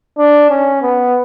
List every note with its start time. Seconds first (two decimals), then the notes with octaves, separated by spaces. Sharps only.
0.18 D4
0.50 C#4
0.81 B3